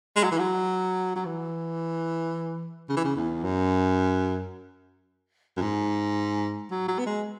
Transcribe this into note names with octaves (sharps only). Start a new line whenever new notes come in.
G#3
F#3
E3
F#3
F#3
E3
C#3
E3
C#3
E2
F#2
F#2
G#2
F#3
F#3
B3
G#3